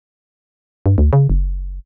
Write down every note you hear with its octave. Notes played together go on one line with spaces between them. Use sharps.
G2
D2
C#3
F#1